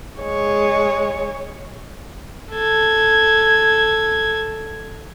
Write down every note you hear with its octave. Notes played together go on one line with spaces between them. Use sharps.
G#3 C#5
A4 G#6